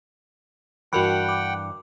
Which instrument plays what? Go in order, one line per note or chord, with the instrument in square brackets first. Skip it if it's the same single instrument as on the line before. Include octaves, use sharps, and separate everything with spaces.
[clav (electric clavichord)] G2 E3 [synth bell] F#4 A#4 B5 [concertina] F#5 G5
[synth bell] D6